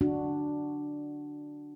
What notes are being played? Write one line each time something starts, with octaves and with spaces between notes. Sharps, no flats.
D4 F#4